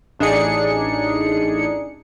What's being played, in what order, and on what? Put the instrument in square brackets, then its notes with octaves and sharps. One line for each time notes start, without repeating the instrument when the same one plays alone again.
[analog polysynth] A1 D4 D#4 G#4 C#7